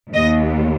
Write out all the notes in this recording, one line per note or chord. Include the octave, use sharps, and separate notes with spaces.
D#2 D#5